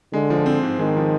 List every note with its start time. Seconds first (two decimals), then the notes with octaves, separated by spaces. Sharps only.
0.13 D3 G#3
0.30 F3
0.46 C4
0.63 G#2
0.79 D#3 G#3
0.96 F3